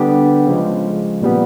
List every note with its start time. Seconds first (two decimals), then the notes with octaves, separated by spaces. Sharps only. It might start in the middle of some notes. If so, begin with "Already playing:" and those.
Already playing: D3 G3 B3 D4 G4
0.47 C#3 F3 G#3
1.22 A#2 G3 B3